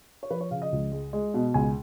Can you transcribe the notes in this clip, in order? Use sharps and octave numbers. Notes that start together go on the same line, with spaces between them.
C#5
F3 B4
C#5
C#3 F5
D#5
C#2
G#3
G#3
B2
C#2 G#5